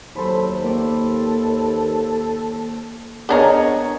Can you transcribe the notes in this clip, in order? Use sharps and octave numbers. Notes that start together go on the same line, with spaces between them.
D#2 F#3 A4 C5 B5
A#3 A4 D5 G5
B3 D4 G#4 A#4 C#5 D#5